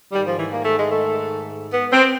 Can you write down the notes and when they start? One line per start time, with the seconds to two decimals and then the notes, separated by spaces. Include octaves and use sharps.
0.12 G#2 D#3 G3
0.26 F3
0.39 E3
0.53 A#3
0.65 A3
0.79 G#3
0.92 A3
1.73 B3
1.92 C4